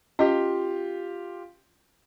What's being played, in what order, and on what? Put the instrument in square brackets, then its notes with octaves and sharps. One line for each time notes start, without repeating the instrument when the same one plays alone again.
[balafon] C#4 D#5 [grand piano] F4 G4